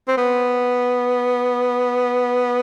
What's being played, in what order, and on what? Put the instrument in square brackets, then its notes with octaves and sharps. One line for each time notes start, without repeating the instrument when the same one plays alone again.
[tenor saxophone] C4
B3